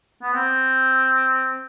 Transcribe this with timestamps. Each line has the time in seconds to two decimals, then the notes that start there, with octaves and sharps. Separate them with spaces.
0.22 B3
0.34 C4